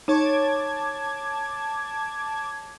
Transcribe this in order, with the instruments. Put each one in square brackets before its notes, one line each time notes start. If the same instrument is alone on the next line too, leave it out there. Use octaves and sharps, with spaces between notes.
[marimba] D#4 [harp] C#5 [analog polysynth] A5 D6 G#6